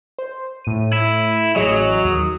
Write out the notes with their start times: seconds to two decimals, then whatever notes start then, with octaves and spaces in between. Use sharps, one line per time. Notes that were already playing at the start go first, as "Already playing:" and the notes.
0.19 C5
0.65 A2 D#7
0.93 E4
1.56 A1 F#3 G#4 D#5
2.04 D#2 D#6